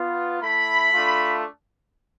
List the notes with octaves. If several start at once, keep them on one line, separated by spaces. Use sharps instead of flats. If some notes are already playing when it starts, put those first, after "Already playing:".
Already playing: B3 F4
A3 E4 B5
A3 D4 F4